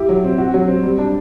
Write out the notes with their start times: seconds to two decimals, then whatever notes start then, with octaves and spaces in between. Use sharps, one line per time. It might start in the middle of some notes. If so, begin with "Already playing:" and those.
Already playing: E4 G4
0.09 F#3
0.24 C4
0.38 F#4
0.54 F#3
0.68 C4
0.83 G3
0.99 D4